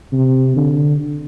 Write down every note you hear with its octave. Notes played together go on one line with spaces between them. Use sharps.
C3
D3